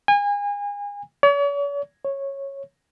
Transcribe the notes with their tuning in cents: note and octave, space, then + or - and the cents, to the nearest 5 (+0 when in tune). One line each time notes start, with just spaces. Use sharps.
G#5 -35
C#5 +45
C#5 -10